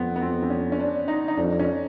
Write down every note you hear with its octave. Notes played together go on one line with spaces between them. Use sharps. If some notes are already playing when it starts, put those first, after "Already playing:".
Already playing: F2 B3 C4
B3
C4
C4
C#4
C#4
D4
D#4
D#4
F2 D4
C#4